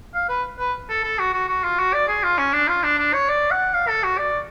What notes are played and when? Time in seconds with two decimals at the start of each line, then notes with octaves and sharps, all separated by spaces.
0.14 F5
0.29 B4
0.59 B4
0.89 A4
1.04 A4
1.19 F#4
1.33 F#4
1.49 F#4
1.64 F4
1.79 F#4
1.93 D5
2.08 G#4
2.23 F4
2.38 C#4
2.53 D4
2.68 F4
2.83 D4
2.98 D4
3.13 C#5
3.29 D5
3.51 F#5
3.74 F5
3.88 A4
4.03 F#4
4.18 D5